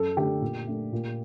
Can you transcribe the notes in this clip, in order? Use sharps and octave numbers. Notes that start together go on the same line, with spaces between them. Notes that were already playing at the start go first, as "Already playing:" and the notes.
Already playing: F#2 A4
D3 A3 D4 G4
A#2
A3 D4
A#2